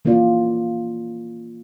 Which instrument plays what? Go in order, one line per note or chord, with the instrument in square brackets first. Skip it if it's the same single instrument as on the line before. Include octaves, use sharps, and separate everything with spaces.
[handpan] E3 A#3 C#4 F4 D5